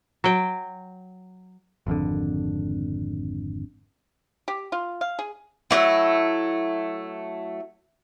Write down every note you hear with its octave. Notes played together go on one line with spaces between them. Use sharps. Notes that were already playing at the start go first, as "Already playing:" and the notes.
F#3 G5
G#1 F2 D3
G4
F4
F5
G#4
F#3 A3 A#3 E4